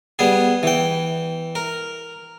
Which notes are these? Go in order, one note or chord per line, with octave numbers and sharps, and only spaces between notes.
G3 B3 G#4
E3 G5
A#4